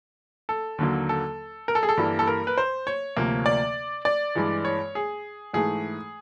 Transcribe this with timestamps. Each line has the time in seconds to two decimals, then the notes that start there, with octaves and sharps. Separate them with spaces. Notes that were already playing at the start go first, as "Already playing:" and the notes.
0.49 A4
0.78 D#2 D3 F#3 A#3
1.09 A4
1.68 A#4
1.75 A4
1.83 G#4
1.89 A4
1.97 G2 E3 G3 A#3
2.19 A4
2.28 A#4
2.47 B4
2.58 C5
2.87 C#5
3.17 D2 C3 F3 A#3
3.46 D5
4.05 D5
4.35 G2 E3 G#3
4.65 C#5
4.95 G#4
5.53 G#2 E3 A3 G#4